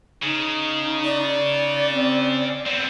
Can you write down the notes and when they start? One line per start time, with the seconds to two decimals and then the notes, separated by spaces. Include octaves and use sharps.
0.22 C#3 D#4
1.05 D5
1.90 C4
2.67 B3 C4